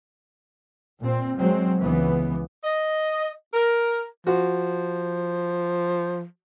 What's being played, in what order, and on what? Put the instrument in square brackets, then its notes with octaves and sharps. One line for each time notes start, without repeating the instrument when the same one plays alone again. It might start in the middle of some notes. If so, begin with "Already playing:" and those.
[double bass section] A#2 C4
F#3 G#3 C4
C#2 C#3 E3 B3
[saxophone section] D#5
A#4
[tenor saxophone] F3 [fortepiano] F#4